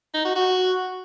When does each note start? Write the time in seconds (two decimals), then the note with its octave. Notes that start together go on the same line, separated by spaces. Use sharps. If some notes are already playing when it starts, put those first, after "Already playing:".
0.14 D#4
0.25 F#4
0.36 F#4